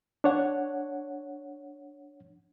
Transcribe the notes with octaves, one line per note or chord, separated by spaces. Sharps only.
D4 C#5 F#5